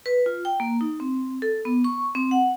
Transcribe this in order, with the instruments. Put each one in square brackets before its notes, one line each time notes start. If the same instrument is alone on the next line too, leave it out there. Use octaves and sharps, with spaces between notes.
[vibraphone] B4
F4
G5
A#3
D#4
C4
A4
B3
C#6
C4
F#5